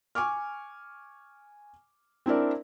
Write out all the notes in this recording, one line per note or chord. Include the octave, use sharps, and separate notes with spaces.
G#5 C#6 D6 F6
C4 D4 E4 A#4 D5